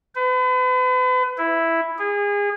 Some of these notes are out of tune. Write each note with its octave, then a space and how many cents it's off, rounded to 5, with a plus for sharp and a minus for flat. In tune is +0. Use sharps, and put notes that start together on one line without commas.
B4 +40
E4 +0
G#4 -30